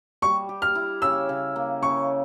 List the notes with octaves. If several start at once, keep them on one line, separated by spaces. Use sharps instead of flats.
G3 C#6
G4
F6
E4
C#3 E6
C#3
A#3
C#3 C#6